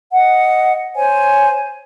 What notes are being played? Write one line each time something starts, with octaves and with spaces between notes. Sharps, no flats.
D#5 F#5
C5 C#5 G#5